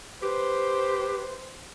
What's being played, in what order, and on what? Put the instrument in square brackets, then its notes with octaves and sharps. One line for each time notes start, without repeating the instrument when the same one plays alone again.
[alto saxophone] G4 [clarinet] B4 [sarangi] C5